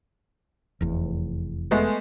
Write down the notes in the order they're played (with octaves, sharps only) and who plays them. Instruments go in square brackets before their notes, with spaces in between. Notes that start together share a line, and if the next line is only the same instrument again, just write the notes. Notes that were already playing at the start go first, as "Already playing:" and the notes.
[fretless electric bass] F1 E2
[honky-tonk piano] G#3 A3 B3